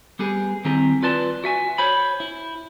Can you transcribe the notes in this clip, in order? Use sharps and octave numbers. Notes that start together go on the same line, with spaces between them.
G3 B3 G4 G#4
D#3 G3 C4 E4 G#4 A#5
F4 B4 D5 A5 C6
F#4 E5 G#5
C5 C#5 B5
E4